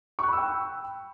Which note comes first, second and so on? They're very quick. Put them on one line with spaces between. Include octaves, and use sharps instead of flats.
C#6 F#6 B5 E6 G5